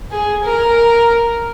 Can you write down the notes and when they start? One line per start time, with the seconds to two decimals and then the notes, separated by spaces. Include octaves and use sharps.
0.12 G#4
0.44 A#4